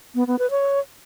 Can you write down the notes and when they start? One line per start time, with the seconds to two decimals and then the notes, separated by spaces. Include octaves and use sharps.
0.15 B3
0.27 B3
0.39 B4
0.51 C#5